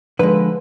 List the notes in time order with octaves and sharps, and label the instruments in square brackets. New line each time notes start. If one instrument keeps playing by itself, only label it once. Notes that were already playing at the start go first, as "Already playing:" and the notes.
[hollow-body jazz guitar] D3 F3 G#3 B4